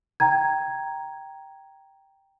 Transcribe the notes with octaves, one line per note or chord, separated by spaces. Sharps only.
G5 A#5 G#6